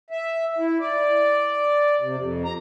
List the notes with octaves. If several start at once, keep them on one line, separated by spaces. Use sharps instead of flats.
E5
E4
D5
C3
F2
A#5